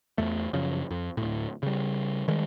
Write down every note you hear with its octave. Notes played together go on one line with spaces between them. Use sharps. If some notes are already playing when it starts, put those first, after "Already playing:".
E2 A3
F#2 C#3 F3
F2
D1 A2
C#3 G3
D#3 G3 G#3